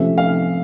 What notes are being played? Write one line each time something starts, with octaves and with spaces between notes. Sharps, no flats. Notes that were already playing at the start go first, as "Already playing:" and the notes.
Already playing: C3 F3 A3 C#4 E5
F5